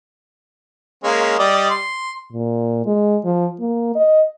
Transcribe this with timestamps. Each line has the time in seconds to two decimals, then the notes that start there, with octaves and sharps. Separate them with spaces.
1.04 G#3 A#3 C#4
1.39 G3 D5 D#5
1.70 C6
2.33 A#2
2.86 G#3
3.25 F3
3.60 A#3
3.95 D#5